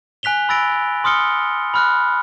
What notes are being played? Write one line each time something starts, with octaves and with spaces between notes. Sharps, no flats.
G#5 F#6 B6 F7 G7
B5 E6 A6 A#6 D7
C6 D#6 F6 C#7 G7
B5 F6 F#6